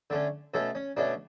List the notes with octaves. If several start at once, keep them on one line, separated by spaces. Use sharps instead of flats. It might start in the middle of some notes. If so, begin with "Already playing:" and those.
D3 A3 C#4
B2 A3 C#4 A4
C#4
B2 A3 C#4 D4